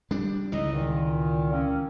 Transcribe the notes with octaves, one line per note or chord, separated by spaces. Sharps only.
G3 D4
C#2 E3 D#4 D#5
A#2 D#3
A#3 C4 C#4